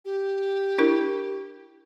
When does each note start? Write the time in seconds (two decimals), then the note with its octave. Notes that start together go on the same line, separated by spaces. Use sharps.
0.05 G4
0.78 D4 E4 A#4